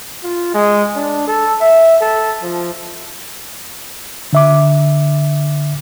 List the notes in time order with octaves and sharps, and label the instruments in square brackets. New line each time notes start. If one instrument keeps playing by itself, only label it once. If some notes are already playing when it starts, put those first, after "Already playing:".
[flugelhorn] F4
G#3
D4
A4
E5
A4
F3
[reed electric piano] D3 E5 D6